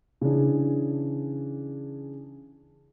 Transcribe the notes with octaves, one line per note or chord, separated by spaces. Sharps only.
C#3 E3 D4 G#4